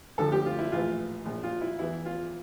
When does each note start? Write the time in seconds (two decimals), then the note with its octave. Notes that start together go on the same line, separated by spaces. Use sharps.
0.18 D2 D3 F3 A4
0.32 G4
0.46 F4
0.59 E4
0.72 A#1 A2 E3 F4
1.25 A#1 A#2 F3
1.43 F4
1.61 E4
1.79 E2 E3 E4
2.06 F4